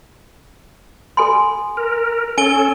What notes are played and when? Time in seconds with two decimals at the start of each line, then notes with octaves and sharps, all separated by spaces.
1.17 A4 G#5 C6
1.77 A#4
2.38 C#4 A4 G#5 D7 G7